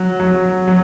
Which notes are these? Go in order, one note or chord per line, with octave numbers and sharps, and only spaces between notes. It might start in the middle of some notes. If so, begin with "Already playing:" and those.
Already playing: F#3
F#3
F#3